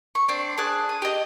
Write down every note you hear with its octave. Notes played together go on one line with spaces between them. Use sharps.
C#6
C4 D4
D4 G#4 F#6
D#6
G4 D#5